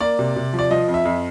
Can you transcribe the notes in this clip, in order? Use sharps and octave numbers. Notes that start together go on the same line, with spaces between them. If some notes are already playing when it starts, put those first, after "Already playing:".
A#3 D5
C3
C3
F3
D5
F3 D#5
F2
E5
F2